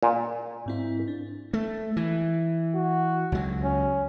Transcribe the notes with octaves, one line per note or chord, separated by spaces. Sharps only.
A#2
G#2 C4 E4
D4
A3
E3
F#4
C#2 F#3
C#4